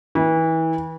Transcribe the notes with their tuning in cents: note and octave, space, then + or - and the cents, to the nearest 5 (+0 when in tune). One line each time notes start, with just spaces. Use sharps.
E3 -30